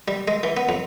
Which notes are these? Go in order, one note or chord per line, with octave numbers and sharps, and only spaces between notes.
G3
G#3
E3
B3
F2